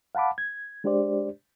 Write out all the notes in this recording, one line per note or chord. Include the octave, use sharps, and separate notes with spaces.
F5 F#5 A5 B5 D6
G#6
G#3 D4 G4 C5 D5